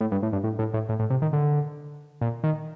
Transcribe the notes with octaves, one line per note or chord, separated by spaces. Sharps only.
A2
G2
A2
G2
A2
A2
A2
A2
A2
C3
D#3
D3
A#2
D#3